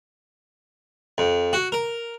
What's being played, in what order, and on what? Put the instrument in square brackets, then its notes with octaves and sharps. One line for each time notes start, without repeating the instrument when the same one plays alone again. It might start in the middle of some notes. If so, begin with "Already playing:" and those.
[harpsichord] F2
F#4
A#4